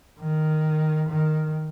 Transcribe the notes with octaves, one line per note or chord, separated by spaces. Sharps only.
D#3
D#3